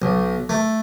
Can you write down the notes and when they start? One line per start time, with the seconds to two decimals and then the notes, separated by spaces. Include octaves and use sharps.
0.02 B1
0.49 A3